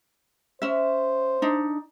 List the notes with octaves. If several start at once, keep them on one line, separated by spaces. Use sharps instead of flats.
C#4 C5 E5
D4 D#4